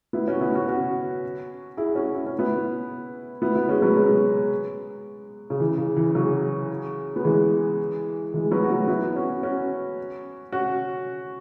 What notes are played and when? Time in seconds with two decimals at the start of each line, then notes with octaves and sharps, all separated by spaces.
0.13 B3 E4
0.28 C#4 F#4
0.41 B3 E4
0.54 C#4 F#4
0.68 C#4 F#4
1.77 E4 G#4
1.95 C#4 F#4
2.15 E4
2.26 C#4
2.39 B3 E4
3.42 B3 E4
3.55 B3 E4
3.69 G#3 C#4
3.82 F#3 B3
3.96 G#3 C#4
5.50 C#3
5.60 E3
5.78 C#3
5.97 E3
6.15 C#3 F#3
7.16 B3
7.24 E3 G#3
8.34 E3 G#3
8.51 F#3 B3
8.64 F#4
8.70 B3 E4
8.88 B3 E4
9.16 C#4 F#4
9.43 C#4 F#4
10.52 C#4 F#4